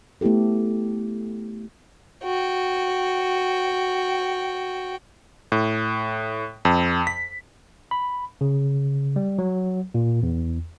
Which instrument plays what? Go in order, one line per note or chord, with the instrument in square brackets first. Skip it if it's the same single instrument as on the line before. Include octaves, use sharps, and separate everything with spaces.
[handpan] A3 B3 E4 G4 A4
[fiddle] F#4 G5
[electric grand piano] A2
F2
B6
[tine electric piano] B5
C#3
G3
F#3
A#2
E2